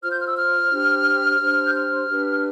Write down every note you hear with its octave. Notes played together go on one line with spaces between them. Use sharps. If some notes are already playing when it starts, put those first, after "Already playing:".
F4 C5 F6
G6
F6
E6
F6
D4 G4 C5
D4 G4 C5
G6
F6
D4 G4 B4